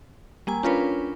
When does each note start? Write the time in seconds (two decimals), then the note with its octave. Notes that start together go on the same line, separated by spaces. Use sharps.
0.47 G3 A#3 G#5
0.63 C#4 D4 F4 A#4 B4 C#5